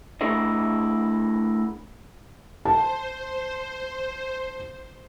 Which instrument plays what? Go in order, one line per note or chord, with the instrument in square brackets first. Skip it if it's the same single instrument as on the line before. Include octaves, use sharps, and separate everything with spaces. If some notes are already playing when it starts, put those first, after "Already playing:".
[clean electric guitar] A3 D4 E4 G#4 A#4 D#5
[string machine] C5 [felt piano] A5